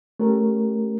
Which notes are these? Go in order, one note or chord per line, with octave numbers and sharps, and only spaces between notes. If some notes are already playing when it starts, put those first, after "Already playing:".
A3 C#4 G4 A#4